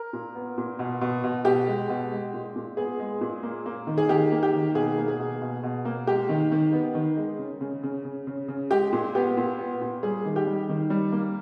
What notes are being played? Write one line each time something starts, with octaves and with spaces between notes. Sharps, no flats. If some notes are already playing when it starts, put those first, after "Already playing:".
Already playing: A#4
A#2
B3
A#2
B2
B2
B2
B2 G4
G#3
B2
G#3
A#2
A#2
B3 G#4
G#3
A#2
A#3
A#3
D#3
G#4
D#3 G4
A#3
G4
D#3
B2 G#4
A#3
G#4
B2
B2
B2
A#3
G#3 G4
D#3
D#3
B3
D#3
G#3
C#3
C#3
C#3
C#3
C#3
C#3
G#3 G4
A#2
B3 G4
A#2
B3
A#2
G3 G#4
D#3
G4
G3
D#3
G3
A#3